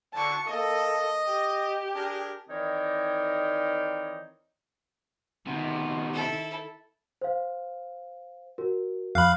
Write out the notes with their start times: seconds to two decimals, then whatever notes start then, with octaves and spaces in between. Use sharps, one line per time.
0.14 D3 F#3 A5 C#6
0.46 A#3 A4 D#5
1.27 G4
1.94 D4 G#4 A#4
2.48 D#3 E3 C4 D#4 C#5 D5
5.47 C3 D#3 B3
6.13 E4 A4
7.21 C5 F5
8.58 F#4 A#4
9.15 F2 F5 B5 F6 F#6